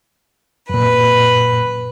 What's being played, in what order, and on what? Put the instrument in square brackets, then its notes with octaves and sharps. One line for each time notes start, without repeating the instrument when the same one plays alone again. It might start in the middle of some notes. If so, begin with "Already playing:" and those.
[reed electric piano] F#2 A#2 [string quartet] B4